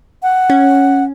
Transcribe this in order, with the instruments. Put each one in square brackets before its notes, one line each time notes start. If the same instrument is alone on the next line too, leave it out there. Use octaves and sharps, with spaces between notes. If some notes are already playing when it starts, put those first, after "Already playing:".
[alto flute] F#5
[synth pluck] C#4